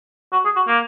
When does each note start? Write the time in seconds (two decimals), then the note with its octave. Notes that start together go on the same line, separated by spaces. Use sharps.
0.32 F#4
0.45 G#4
0.56 F#4
0.68 A#3